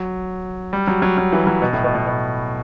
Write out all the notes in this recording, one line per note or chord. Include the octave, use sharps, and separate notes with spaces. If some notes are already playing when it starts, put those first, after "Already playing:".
Already playing: F#3
G3
F#3
F#3
F#3
E3
F#3
B2
A2
B2
B2
B2